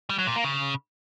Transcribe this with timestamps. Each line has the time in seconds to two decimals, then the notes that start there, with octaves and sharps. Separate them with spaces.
0.10 G3
0.18 F#3
0.27 A#2
0.36 A#3
0.44 C#3